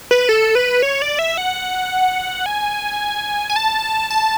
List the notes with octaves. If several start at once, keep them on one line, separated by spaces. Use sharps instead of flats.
B4
A4
B4
C#5
D5
E5
F#5
G#5
G#5
A5
A5